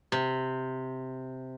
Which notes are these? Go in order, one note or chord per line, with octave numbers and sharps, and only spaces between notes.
C3